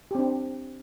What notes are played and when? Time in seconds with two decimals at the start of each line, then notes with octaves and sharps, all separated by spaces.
0.11 G4
0.15 C4
0.19 D4